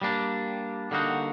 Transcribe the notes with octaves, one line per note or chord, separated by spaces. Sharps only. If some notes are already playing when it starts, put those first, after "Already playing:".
G3 A#3 D4
D3 G3 A#3 D#4 F#4